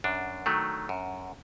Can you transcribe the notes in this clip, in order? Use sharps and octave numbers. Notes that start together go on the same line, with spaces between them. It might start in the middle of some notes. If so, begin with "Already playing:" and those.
F#2 D4
D#3 F#3 A3
F#2